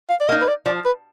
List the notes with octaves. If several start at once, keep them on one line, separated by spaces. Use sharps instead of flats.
F5
D5
A#3 D#4 D#5
B4
D5
F3 D5
B4